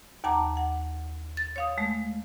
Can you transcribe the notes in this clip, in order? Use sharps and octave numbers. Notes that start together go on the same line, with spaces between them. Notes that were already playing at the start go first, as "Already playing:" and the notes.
D#2 F#5 A5 A#5 D6
F#5
A6
C#5 F5 D#6
G#3 A3